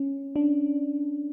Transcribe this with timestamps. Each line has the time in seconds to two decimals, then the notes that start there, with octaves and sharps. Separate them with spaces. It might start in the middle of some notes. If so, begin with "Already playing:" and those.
Already playing: C#4
0.36 D4